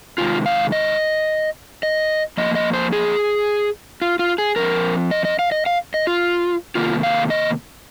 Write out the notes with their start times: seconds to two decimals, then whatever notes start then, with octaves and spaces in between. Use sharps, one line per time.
0.18 C3 D#3 G#3 F4
0.46 F5
0.72 D#5
1.83 D#5
2.37 F2 F3 A#3 D#5
2.55 D#5
2.73 C5
2.92 G#4
4.02 F4
4.19 F4
4.38 G#4
4.56 F2 F3 C4 A#4
5.11 D#5
5.25 D#5
5.39 F5
5.52 D#5
5.66 F5
5.94 D#5
6.07 F4
6.75 C3 D#3 A#3 F4
7.03 F5
7.30 D#5